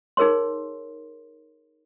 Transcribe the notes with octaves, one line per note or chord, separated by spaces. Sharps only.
D#4 G#4 A#4 C#5 C6